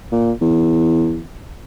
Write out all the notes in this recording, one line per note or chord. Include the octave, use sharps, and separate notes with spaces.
A#2
E2